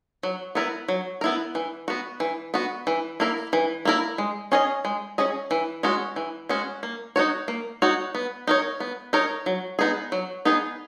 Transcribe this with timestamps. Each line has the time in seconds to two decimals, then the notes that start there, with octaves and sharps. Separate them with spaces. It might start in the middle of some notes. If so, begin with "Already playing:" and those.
0.23 F#3
0.55 B3 E4 A#4
0.88 F#3
1.21 B3 E4 A#4
1.55 E3
1.88 B3 F#4
2.20 E3
2.54 B3 F#4
2.87 E3
3.20 A#3 E4 A#4
3.53 E3
3.85 A#3 E4 A#4
4.18 G#3
4.52 C#4 G#4 D#5
4.85 G#3
5.18 C#4 G#4 D#5
5.51 E3
5.83 G#3 C#4 F#4
6.16 E3
6.49 G#3 C#4 F#4
6.83 A#3
7.16 D#4 F#4 C#5
7.48 A#3
7.82 D#4 F#4 C#5
8.15 B3
8.47 D#4 A#4 C#5
8.80 B3
9.13 D#4 A#4 C#5
9.46 F#3
9.79 B3 D#4 G#4
10.12 F#3
10.45 B3 D#4 G#4